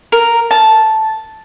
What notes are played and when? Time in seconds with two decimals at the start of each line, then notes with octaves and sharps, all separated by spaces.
0.12 A#4
0.51 A5